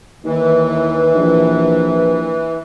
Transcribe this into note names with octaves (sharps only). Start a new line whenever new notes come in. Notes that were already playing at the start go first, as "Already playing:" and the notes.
D#2 E3
A#1